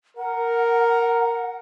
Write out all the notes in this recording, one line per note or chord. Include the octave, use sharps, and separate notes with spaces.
A#4 F#5